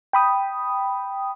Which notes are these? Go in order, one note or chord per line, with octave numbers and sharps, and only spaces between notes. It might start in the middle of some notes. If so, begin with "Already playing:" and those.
G5 B5 D#6